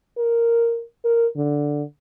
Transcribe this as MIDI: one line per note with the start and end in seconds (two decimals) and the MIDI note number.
0.17 0.83 70
1.05 1.27 70
1.37 1.82 50